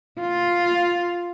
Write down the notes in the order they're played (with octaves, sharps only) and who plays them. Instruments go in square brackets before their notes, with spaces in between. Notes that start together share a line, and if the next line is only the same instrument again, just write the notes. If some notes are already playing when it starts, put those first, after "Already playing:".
[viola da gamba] F4